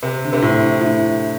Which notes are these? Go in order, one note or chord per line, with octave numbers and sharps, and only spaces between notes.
C3
D3
C3
A2
A2